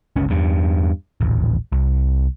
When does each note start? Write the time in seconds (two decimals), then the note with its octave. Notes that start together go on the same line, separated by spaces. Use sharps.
0.16 G1 C#2 C#4
0.30 E2 G2
1.21 D#1 A1
1.72 C2